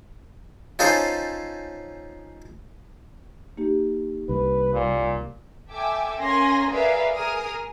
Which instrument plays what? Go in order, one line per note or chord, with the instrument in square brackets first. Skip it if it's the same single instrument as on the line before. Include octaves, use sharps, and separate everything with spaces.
[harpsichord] C#4 D#4 F4 G#4 A4 C5
[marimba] A#3 D#4 G4
[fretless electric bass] C2 [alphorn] B4
[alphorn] A#2
[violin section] A4 E5 G5 G#5 D6 E6
A#3 C#4 A#4 G#5 C6 A#6
G#4 A#4 B4 D5 E5 F5
G#4 A#4 D#6 F6